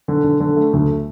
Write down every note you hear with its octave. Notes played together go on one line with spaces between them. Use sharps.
D3
D3
D3
A3
D2